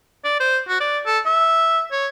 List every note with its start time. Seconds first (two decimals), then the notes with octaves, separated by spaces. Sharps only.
0.25 D5
0.40 C5
0.68 F#4
0.80 D5
1.06 A4
1.26 E5
1.92 C#5